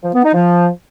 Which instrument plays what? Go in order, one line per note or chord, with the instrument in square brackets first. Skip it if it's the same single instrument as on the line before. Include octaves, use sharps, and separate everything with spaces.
[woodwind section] F3
B3
D#4
F3